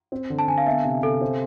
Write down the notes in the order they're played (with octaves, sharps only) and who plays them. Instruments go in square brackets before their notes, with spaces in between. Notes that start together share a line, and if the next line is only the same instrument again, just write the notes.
[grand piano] C4
D3
[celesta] A5
[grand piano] D3 [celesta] G#5
[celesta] F5
[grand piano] B3 [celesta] E5
[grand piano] C3
[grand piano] C3 [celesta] A4
[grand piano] C4